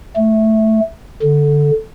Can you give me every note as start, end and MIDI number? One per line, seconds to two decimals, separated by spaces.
0.16 0.80 57
1.22 1.71 50